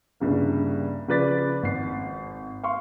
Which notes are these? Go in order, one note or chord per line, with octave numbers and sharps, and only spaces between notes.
C2 G2 C#3 A#3
C#3 F3 B4 D5 A6 B6
G#1 C7
F5 C6 C#6